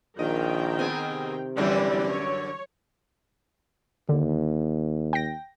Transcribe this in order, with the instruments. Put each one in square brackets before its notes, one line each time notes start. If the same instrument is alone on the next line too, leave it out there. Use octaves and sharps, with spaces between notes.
[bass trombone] A#1 [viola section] D#3 A#4 G5 [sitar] D#5
[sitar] B3 C4 G#4
[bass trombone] C3
[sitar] F#2 D3 D4 [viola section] E3 G3 G4
[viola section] C#5
[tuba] D#2 [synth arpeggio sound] D3
[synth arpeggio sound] G5 A#6